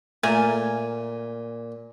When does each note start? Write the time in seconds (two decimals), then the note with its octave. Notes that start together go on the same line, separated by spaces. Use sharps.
0.23 A#2 A3 A#4 G#5